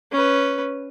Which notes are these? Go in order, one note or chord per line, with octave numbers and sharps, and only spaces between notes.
C#4 B4